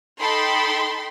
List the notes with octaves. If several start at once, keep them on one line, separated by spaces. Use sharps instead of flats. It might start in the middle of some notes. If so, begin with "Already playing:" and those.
D#4 A4 G5 B5 C6